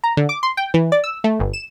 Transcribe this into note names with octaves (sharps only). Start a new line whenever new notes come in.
A#5
D3
D6
C6
G5
E3
D5
E6
A3
G1
E7